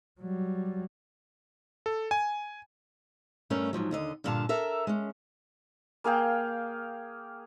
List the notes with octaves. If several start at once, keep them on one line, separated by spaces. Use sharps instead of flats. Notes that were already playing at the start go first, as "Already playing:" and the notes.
F#3 G3
A4
G#5
G2 A3 C#4 A#4
G#2 B2 F3 F#3
D#2 D3 D#5
G2 A#2 D3 F5 A5
A4 A#4 E5
G#3 C#4
A#3 G#4 F5 G5